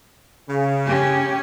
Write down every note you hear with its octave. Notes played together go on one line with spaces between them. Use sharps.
C#3
C#4 G4